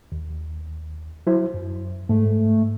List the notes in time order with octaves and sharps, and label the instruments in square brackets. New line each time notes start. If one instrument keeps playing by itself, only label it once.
[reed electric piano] D#2
F#3 E4 C5
F#2
[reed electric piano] G#2 [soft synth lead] A3